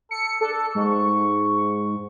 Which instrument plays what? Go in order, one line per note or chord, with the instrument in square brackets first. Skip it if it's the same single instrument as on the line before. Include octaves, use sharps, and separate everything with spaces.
[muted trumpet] A4 [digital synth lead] C#7
[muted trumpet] D4 [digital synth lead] A4
[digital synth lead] G#2 [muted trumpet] C#6